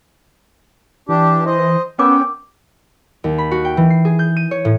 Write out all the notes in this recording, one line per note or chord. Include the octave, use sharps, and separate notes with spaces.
E3 D4 G4
C5 D#5
B3 C#4 A#4 G5 D6
D#2
B5
F#4
G5
E3
C7
G#4
G6
D#7
C#5
A2